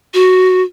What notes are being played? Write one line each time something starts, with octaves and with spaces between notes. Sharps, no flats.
F#4